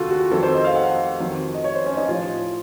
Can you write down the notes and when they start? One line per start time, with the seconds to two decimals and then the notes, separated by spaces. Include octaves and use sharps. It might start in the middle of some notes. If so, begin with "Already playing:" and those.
Already playing: D#2 C#3 F#3 F4 F#4 A4
0.10 F#4
0.31 F2 D#3 F#3 A4
0.43 C5
0.54 D#5
0.64 F5
0.76 F#5
1.20 F2 D#3 F#3
1.54 D#5
1.64 C#5
1.75 C5
1.86 C#4
1.97 D#4
2.08 A2 F3 F4